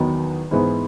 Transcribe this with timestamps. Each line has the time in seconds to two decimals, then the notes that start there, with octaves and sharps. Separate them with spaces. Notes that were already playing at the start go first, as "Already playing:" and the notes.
Already playing: E2 D#3 F#3 B3 D#4
0.51 G#2 E3 G#3 B3 D#4